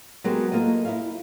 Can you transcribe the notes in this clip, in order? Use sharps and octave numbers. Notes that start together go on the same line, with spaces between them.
F#3 G#3 B3 F#4 G4 A#4
A#3 F4 A4 D#5
E4 E5 F5